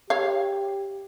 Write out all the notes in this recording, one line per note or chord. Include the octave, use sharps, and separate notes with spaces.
G4 C#5 F5